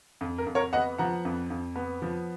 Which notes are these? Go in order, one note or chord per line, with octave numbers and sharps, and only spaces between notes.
F2
A#4
F2
A#4 C#5
B3 D#5 F#5
F3 F#5 A#5
F2
F2
B3
F3